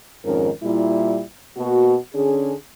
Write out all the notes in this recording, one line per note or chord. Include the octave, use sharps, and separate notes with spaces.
F2 G#2 D#3 C#4 A#4
A#2 G3 E4
B2 A#3 F#4
D3 C#4 G#4